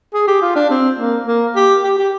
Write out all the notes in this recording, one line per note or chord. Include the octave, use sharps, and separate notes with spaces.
G#4
G4
F4
D4
C4
A#3
A#3
G4
G4
G4